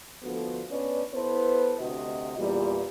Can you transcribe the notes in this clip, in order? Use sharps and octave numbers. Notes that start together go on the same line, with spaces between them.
D2 D3 F3 B3 F#4 A4
B3 C#4 D4 B4 C#5 D5
B3 E4 A4 B4 C5
D2 C3 F#4 D#5
E2 A#2 G3